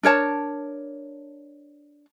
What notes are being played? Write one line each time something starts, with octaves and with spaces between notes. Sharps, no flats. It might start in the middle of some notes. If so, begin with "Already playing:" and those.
D4 A#4 C#5 A5